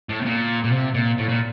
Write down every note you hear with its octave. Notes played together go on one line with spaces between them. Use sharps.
A2
C3
A#2
A#2
C3
A#2
A2
A#2